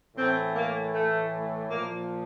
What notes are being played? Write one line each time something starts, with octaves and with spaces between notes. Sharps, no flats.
A2 E3 C4
A#3
A3
A#2 F3 A#3